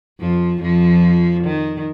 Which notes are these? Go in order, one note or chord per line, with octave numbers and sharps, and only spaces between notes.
F2 F3
F2 F3
D#3